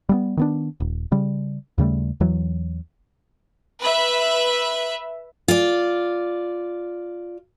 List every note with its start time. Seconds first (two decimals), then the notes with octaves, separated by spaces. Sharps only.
0.09 G3 A3 B3
0.37 D#3 B3 D4
0.80 D#1
1.12 C#3 G3
1.78 D#2 C#3 G3 A3
2.20 E2 E3 F#3
3.81 B4 E5
5.48 F4 D5